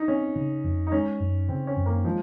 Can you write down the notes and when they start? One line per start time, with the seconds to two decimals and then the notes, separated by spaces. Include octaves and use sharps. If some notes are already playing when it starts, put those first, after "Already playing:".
Already playing: D#4
0.08 C4 C#4
0.36 C#3
0.64 F2
0.87 D#4
0.92 G#3 C#4
1.20 F#2
1.49 C#3 C4
1.67 C#4
1.77 F#2
1.86 A#3
2.04 F3 G#3